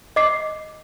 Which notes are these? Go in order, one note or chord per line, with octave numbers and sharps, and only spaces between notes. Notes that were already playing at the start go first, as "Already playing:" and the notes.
D#5 D6 C7